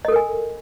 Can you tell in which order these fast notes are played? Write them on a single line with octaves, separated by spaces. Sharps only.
D#5 A4 A#4 G#5